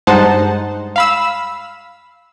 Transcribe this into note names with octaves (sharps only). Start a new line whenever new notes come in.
G2 G#3 D#4 C5 F#5 A5
F5 B5 E6